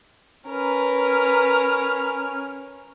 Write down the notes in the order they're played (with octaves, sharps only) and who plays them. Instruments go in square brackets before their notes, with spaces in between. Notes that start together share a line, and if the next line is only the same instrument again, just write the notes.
[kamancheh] C#4 F6 [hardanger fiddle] A#4 B4